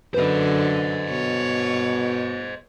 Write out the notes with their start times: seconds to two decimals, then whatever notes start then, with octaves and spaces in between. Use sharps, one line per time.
0.14 F#2 D3 B4 C5 D#5
1.10 B2 C#5